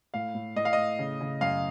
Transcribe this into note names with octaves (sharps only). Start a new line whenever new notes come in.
A2 F5
A2
A2 D#5
F5
A2 D#5
C#3
C#3
F#2 F5